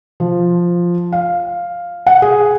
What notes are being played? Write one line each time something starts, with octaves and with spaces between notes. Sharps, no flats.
F3
F5
F#5
G#4